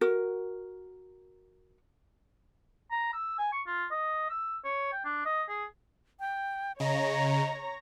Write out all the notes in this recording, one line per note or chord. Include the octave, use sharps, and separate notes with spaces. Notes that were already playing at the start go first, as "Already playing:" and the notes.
F#4 A#4
A#5
E6
G#5
C#6
F4
D#5
E6
C#5
G5
D4
D#5
G#4
G5
C#3 C#5 D#5 A#5